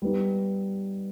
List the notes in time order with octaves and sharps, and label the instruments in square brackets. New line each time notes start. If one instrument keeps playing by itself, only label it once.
[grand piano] G3 B3 D#4